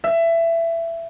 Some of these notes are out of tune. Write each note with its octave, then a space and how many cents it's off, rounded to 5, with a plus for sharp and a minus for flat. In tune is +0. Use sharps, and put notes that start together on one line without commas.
E5 +20